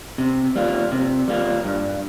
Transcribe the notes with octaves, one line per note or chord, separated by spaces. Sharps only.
C3
G3 A#3 F4
C3
G3 A#3 F4
G2